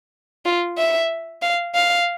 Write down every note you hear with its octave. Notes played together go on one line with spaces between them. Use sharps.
F4
E5
F5
F5